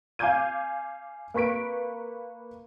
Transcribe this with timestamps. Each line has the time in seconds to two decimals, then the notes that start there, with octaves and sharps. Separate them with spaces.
0.19 F5 G#5 D6 G6 G#6 D#7
1.34 A#3 B4 C#6 B6 D7